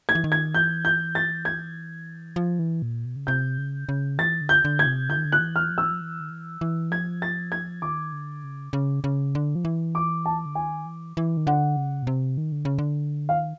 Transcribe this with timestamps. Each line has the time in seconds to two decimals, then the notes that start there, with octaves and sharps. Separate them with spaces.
0.09 G#6
0.15 E3
0.24 D#3
0.32 G#6
0.54 E3 G6
0.85 G6
1.15 A6
1.45 G#6
2.36 F3
2.59 E3
2.82 A#2
3.05 B2
3.16 C#3
3.27 C3 G6
3.58 C#3
3.89 C#3
4.18 E3 A6
4.41 D3
4.49 G6
4.65 D3
4.79 G#6
4.86 C3
5.09 D3 G6
5.18 D#3
5.25 D3
5.32 F#6
5.39 E3
5.56 F6
5.71 F3
5.78 E3 E6
5.91 F3
6.01 E3
6.20 D#3
6.30 E3
6.61 E3
6.91 F3 G#6
7.22 A6
7.52 G#6
7.82 D#3 D6
8.13 D3
8.44 C#3
8.73 C#3
9.04 C#3
9.35 D3
9.55 F3
9.65 E3
9.95 D6
10.26 A5
10.46 D3
10.55 D#3 G#5
10.86 E3
11.17 E3
11.37 D#3
11.47 D3 F#5
11.77 C#3
12.03 B2
12.07 C3
12.38 D#3
12.52 D3
12.65 C#3
12.79 D3
13.29 D#3 F5